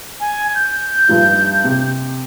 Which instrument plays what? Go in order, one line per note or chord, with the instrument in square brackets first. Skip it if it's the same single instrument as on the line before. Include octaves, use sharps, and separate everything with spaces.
[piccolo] G#5
G6
[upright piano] G2 F3 D#4
C3